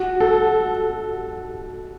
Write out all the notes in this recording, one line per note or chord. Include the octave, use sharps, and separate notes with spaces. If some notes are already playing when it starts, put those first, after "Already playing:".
Already playing: F#4
A4